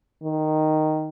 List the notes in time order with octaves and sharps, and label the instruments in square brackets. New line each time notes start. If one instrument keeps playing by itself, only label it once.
[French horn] D#3